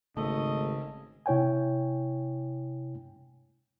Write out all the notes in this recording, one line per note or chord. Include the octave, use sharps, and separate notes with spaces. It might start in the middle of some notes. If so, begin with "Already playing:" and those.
G#1 C#3 A3 D#5
C3 E4 C#5 G5 G#5